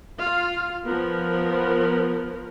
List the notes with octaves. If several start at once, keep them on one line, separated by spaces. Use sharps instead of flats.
F4 F5
F3 B3 A#4